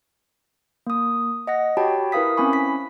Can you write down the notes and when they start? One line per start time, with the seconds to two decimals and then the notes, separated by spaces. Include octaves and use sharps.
0.87 A#3 D#6
1.47 D#5 F#5 A#6
1.77 F#4 G4 C#5 G5 A5 B5
2.12 E4 A#4 B4 F5 D#6 B6
2.37 C4 C#4 E4 G#5 B5 C#6
2.53 B6